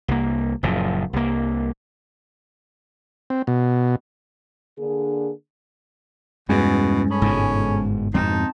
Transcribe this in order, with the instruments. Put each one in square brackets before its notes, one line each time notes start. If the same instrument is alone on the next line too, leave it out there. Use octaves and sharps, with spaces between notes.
[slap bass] C2 A#3
F#1 F#2 A#2 F3
C2 A#3
[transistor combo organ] C4
B2
[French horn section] D3 A#3 D4 G#4
[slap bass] E2 [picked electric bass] G2 G#3 [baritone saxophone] B2 [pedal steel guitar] C#4
[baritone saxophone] C#4 [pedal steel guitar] G#4 A4 B5
[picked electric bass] G1 [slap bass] G#2 B2 G#3
[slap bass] F2 G#2 B2 [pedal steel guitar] C4 A5 [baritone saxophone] D#4